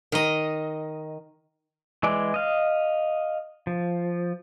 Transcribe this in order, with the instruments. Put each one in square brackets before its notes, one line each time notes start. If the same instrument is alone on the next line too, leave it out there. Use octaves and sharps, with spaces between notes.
[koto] D#3 D#5
[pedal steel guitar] E3 G#3 D5
D#5 F5
F3